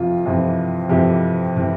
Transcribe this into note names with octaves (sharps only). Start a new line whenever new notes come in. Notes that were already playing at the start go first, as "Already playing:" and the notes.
Already playing: F2 C3 E3 F4
F2 C3 E3
F2 C3 E3 G4
C3 E3